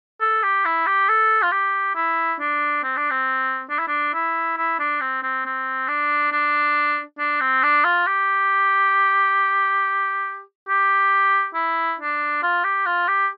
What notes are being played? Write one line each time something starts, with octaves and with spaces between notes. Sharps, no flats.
A4
G4
E4
G4
A4
F4
G4
E4
D4
C4
D4
C4
D4
E4
D4
E4
E4
D4
C4
C4
C4
D4
D4
D4
C4
D4
F4
G4
G4
E4
D4
F4
G4
F4
G4